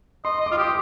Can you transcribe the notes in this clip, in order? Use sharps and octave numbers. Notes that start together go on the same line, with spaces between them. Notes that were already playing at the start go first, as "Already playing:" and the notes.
D#5 C6
D#5
D6
F4 D#6
G4 D6